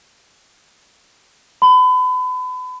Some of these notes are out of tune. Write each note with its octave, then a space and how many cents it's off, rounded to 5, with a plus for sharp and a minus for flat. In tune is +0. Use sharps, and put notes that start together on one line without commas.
B5 +35